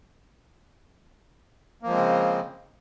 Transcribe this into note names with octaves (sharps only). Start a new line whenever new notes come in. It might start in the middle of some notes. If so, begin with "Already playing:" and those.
C#3 F3 G#3 A#3 C4